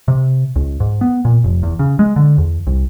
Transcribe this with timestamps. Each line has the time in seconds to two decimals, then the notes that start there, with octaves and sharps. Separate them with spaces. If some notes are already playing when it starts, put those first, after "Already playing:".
0.08 C3
0.56 C#2
0.80 G#2
1.01 B3
1.25 A#2
1.44 F1
1.63 E2
1.79 C#3
1.99 G#3
2.16 D3
2.38 E2
2.67 C2